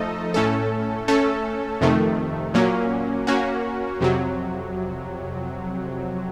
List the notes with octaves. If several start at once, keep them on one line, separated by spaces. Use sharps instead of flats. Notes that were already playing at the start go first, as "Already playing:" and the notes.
Already playing: F3 A3 D#4 A4 D#5
A2 A3 C#4 A4
A3 C#4 A4
F2 C3 D#3 A3
A#2 F#3 A#3 C#4
A#3 C#4 F#4
F2 C3 F#3